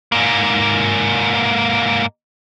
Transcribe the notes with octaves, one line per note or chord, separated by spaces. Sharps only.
G#2 A#3